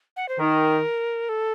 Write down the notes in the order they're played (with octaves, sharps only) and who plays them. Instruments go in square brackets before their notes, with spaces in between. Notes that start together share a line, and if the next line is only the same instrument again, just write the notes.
[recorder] F#5
C5
[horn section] D#3 [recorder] A#4
[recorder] A4